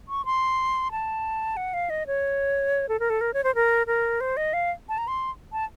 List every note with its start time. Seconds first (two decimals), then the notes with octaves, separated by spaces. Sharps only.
0.08 C#6
0.25 C6
0.91 A5
1.57 F#5
1.74 F5
1.90 D#5
2.07 C#5
2.89 A4
3.00 A#4
3.10 A4
3.21 A#4
3.34 C#5
3.44 C5
3.55 A#4
3.87 A#4
4.21 C5
4.37 D#5
4.53 F5
4.89 A5
4.98 A#5
5.08 C6
5.52 A5